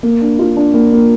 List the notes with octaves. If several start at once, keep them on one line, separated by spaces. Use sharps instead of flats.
A#3
D4
F4
D4
A#3
A#3